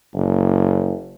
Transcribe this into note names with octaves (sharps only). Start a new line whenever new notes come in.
F#1